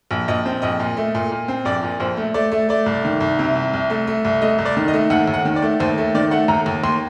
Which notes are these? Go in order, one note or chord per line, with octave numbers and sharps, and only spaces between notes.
A#1
A#1 D#5
C4
A#1 D#5
A#2
A3
A#2
A#2
C4
A#1 D5
A#2
A#1 C5
A3
A3 D5
A3
A3 D5
C2
D#3
C2
C3
C2
C2
A3
A3
C2
A3 D#5
C2
D5
D#3
D#5
A3
D#2 F#5
D#2
F#5
D#3
D5
A3
D#2 C5
A3
D#3 D5
A3 F#5
D#2 A#5
D#2
D#2 C6